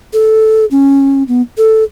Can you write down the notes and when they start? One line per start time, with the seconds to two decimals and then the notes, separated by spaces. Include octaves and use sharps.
0.13 A4
0.71 C#4
1.28 B3
1.58 A4